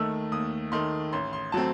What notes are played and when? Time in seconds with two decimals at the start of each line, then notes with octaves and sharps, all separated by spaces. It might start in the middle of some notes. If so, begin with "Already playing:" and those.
Already playing: D#2 D#3 A3 E6
0.32 D#2 D#6
0.72 D#3 A3 C6
1.13 A1 C6
1.33 C6
1.52 F#3 A3 C4 A5